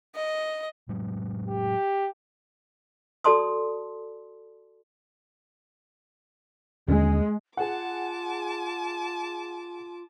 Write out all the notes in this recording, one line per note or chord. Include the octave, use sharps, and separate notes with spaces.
D#5
A2 F#3 G#3
G4
F#4 A4 D5 A5 C6 D#6
D#2 D3 G#3 C#4
F4 G#4 F#5 A5 D6